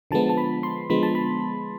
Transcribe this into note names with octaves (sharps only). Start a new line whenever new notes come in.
D3 F3 G#3 B3 A5
A5
B5
C6
D3 F3 G#3 B3 B5
A5
B5